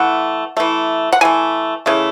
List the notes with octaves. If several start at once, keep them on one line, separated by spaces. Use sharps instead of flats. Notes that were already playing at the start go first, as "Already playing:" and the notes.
Already playing: E3 A3 F#5
E3 A3
F#5
E3 A3 G#5
C#3 E3 A3